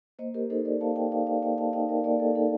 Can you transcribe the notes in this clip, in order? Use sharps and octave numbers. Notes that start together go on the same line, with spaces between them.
A#3 C5 D#5
G4 A#4
D#4 A4 C5
A#4 D5
A#3 F5 A5
D#5 G5
D#4 D5 F5
D5 F5
A#3 D#5 G5
F5 A5
D#4 D#5 G5
A#4 D5
A#3 A#4 D5
A4
D#4 A4